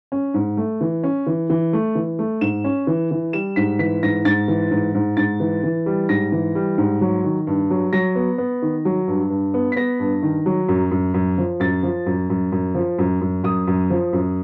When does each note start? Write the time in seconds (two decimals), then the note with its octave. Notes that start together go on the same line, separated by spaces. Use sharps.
0.12 C#4
0.34 G#2
0.57 A3
0.81 E3
1.03 C#4
1.27 E3
1.50 E3
1.73 A3
1.95 E3
2.19 A3
2.41 G#2 E7
2.64 C#4
2.87 E3
3.11 E3
3.33 G3 E7
3.56 G#2 B6
3.79 E3 B6
4.03 G#2 A#6
4.25 G#2 A6
4.48 E3
4.71 G#2
4.95 G#2
5.17 G#2 A6
5.40 E3
5.64 E3
5.86 G3
6.09 G#2 A#6
6.32 E3
6.55 G3
6.78 G#2
7.01 F#3
7.24 D#3
7.47 G2
7.70 F#3
7.93 F#3 A#6
8.15 B3
8.38 B3
8.62 D#3
8.85 F#3
9.08 G2
9.30 G2
9.54 B3
9.72 B6
9.76 B3 A#6
10.00 G2
10.23 D#3
10.46 F#3
10.69 F#2
10.91 F#2
11.14 F#2
11.38 F3
11.60 F#2 A6
11.83 F3
12.06 F#2
12.30 F#2
12.52 F#2
12.75 F3
12.99 F#2
13.21 F#2
13.44 F#2 D#6
13.67 F#2
13.90 F3
14.13 F#2